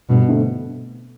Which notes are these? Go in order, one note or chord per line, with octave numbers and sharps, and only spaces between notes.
G2 B2
D3 A3 C4